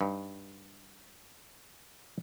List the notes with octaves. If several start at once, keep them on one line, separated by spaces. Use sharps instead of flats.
G2 D#4